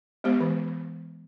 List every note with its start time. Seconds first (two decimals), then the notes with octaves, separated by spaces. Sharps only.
0.24 G#3 B3 G4 C5
0.41 E3